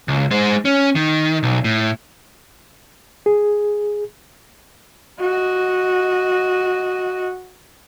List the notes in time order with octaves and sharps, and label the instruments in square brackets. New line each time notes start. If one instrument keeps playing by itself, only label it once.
[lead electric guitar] C#2
G#3 C5
C#4
D#3
B1
A2
[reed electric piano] G#4
[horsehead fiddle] F#4 D#5